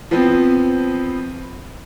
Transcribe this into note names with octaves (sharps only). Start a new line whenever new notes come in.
F3 B3 C4